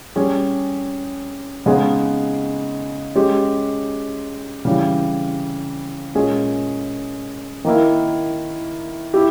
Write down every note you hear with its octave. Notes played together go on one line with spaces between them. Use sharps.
G3 C#4 G#4
C#3 G#3 B3 D#4 G#4
G#3 C#4 G4
C#3 E3 G3
A#2 G#3 C#4 G#4
D#3 A#3 E4
E4 G4